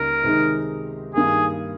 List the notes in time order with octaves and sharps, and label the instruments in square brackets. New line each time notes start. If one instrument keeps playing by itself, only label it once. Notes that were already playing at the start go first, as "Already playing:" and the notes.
Already playing: [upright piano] C#2 C#3 G3 A#3 D#4 [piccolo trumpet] A#4
[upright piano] C3 D#3 G#3 D#4
[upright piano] G2 D#3 A#3 D#4 G4 [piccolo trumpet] G#4